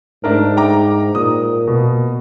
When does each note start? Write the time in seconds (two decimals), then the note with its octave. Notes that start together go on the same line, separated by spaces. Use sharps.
0.24 G#2 A3 D4 A#4
0.57 G5 A#5 D6
1.15 A#2 D#6
1.67 B2